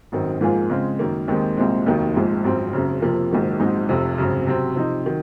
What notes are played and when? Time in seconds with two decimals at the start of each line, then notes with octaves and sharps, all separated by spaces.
0.12 G#1 F#2 D#3
0.41 G#2 F3 A#3 F4 G#4
0.70 C#3 G#3 C4 F4
0.99 F#2 D#3 A#3
1.28 D#2 D#3 G#3 C4
1.57 C2 A#2 G#3 C4
1.85 F1 D#2 D#3 F#3
2.14 A#1 G#2 F3 G#3
2.44 G#1 F#2 F3 C4
2.73 F#1 F#2 C#3
3.02 F2 C3 F3 A#3
3.31 A#1 G#2 D#3 F#3
3.60 A#1 G#2 F#3 C4 D#4
3.89 F1 F2 C3
4.18 G#1 F#2 C#3
4.47 C3 F#3 C4
4.76 C3 F3 C4 D#4
5.06 D#3 F#3